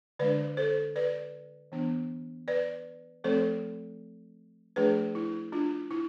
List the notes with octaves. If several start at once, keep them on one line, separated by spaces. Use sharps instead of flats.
D3 G#3 D4 B4 D5
A4 C5
B4 D5
E3 B3 D4
B4 D5
F3 A3 C4 A4 C5
F3 A3 D4 G#4 B4
E4
D4 F4
E4